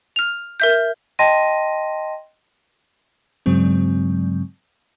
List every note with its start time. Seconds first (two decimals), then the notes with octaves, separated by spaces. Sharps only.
0.16 F6 F7
0.60 A#4 E5 G6
1.19 D#5 G5 A5 C6 A#6 D#7
3.46 G2 C#3 F#3 G#3 C4